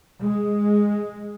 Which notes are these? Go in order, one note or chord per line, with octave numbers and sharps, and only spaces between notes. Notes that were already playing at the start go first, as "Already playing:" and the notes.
G#3